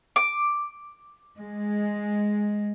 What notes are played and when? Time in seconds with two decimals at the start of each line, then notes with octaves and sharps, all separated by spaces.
0.16 D6
1.38 G#3